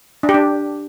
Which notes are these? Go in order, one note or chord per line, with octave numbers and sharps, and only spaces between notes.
D4
G4
D4